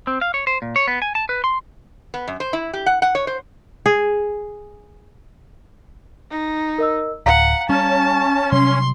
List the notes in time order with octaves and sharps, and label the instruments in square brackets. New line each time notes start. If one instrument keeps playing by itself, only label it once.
[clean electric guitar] C4
F5
C#5
C5
A#2
C#5
B3
G#5
A5
B4
C6
[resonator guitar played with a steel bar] B3
F#2
C5
E4
G4
F#5
F#5
C#5
C5
[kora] G#4
[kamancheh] D#4
[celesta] A#4 D#5 E6
[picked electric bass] D1 [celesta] F5 A#5 B6 [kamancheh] F#5
[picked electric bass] G3 [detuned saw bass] C#4 [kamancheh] A5
[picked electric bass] C3 F#3 G3 [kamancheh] C6